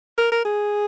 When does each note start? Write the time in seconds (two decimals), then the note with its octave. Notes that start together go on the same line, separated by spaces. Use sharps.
0.18 A#4
0.32 A#4
0.45 G#4